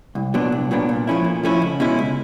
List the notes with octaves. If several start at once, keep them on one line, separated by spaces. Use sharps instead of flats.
C2
A#2 F#3 B3 D4
C2
A#2 F#3 B3 D4
A#2
F3 A3 C#4 E4
A#2
F3 A3 C#4 E4
C#2
B2 G#3 C#4 E4
C#2